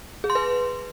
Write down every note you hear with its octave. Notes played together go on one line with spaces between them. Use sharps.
G#4
C6
B4